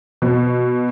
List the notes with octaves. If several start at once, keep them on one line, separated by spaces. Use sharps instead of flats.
B2